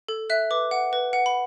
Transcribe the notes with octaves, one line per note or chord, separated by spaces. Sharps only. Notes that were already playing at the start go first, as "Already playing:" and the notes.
A4
E5 F#6
B4 D6
F#5
B4
F#5
B5